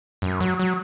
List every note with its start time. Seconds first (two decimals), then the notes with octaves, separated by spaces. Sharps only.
0.22 F#2
0.40 F#3
0.59 F#3